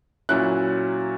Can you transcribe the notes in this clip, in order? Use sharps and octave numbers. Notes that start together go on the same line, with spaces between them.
A#2 F#3 C#4 E4 F#6